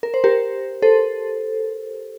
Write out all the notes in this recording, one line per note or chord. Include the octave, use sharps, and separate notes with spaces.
A#4
C5
G4 A#4
A4 C5